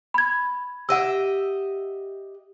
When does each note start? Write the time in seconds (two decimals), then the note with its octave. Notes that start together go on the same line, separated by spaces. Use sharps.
0.14 B5 G#6
0.89 G4 D#5 E5 F#5 E6